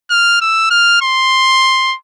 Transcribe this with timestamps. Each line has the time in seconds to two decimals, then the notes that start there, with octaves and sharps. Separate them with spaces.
0.10 F6
0.41 E6
0.71 F6
1.02 C6